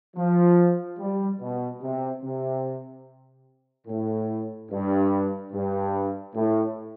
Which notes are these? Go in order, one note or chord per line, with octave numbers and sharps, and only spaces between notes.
F3
G3
B2
C3
C3
A2
G2
G2
A2